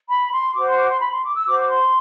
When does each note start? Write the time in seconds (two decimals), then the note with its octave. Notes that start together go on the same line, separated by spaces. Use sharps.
0.09 B5
0.32 C6
0.56 F#4 C5 D6
0.67 C6
0.78 D6
0.90 C6
1.01 B5
1.13 C6
1.24 D6
1.36 E6
1.47 F#4 C5 D6
1.59 D6
1.70 C6